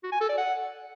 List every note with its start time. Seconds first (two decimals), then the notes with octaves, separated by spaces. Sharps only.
0.04 F#4
0.12 G#5
0.21 A4
0.29 D5
0.38 F#5